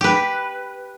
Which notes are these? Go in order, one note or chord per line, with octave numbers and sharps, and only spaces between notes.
G4 B4